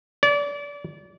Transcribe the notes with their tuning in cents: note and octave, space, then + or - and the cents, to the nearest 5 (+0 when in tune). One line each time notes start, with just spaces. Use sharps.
D5 -30